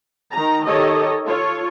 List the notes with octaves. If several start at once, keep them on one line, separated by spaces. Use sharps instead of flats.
D#3 A#5
D#3 G4 A4 C#5 D#5
F4 A4 C#5